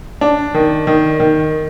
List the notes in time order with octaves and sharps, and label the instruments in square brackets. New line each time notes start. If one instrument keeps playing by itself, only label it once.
[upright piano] D4
D#3
D#3
D#3